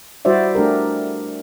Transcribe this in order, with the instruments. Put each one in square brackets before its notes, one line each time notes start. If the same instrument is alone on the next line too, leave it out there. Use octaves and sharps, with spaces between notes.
[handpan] G3 E4 F#4 C5 D5 E5
A3 D4 G4 A#4